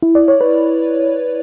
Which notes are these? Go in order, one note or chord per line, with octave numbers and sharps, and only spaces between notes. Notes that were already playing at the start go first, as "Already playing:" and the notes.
E4
D5
C#5
B4